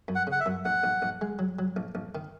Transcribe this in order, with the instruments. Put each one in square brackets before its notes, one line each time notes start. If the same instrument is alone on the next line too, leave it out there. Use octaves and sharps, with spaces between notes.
[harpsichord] F#2
[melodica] F#5
[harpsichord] C#3
[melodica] F#5
E5
[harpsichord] F#2
[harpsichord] A#1 [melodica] F#5
[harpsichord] A#1
A#1
G#3
F#3
F#3
A#1
A#1
D#3